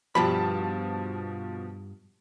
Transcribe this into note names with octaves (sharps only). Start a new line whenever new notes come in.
G2 B2 F3 A5 B5